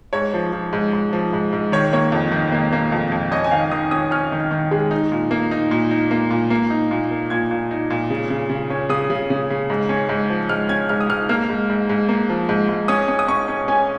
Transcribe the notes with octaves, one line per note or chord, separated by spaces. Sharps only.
G#2 C#5
F3
F3
G#2
G#2
F3
G#2
G#2
D#3 C#5
A#3 C#5
F2
D#3
A#3
A#3
F2
F2
C#4 D#5
G#5
D#3 F5
D#3 D#6
C#4 D#6
C#4 F6
D#3
D#3
G#3
D#4
A#2
A#3
D#4
A#2
D#4
A#3
A#2
A#3
D#4
A#2
A#3
A#2 G#6
A#2
D#4
A#2
C#3
C#3
C#3
C#4
C#3 D#6
C#3
C#3
C#3
G#2
C#4
G#2
F3
G#2 F6
C#4 G#6
G#2 F6
D#6
G#2 F6
A#3 F6
G#2
G#2
G#2
A#3
F3
G#2
G#2
C#4 D#6
C#4
D#6
C#4 C#6
C#4
C#4 G#5